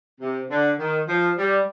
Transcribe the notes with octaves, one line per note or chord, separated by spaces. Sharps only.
C3
D3
D#3
F3
G3